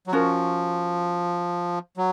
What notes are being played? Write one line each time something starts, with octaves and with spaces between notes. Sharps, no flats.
F#3
F3 C#4 F#4 A#4
F#3